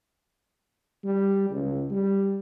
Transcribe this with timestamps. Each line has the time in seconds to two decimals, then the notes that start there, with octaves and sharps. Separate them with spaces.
1.04 G3
1.50 C#2
1.90 G3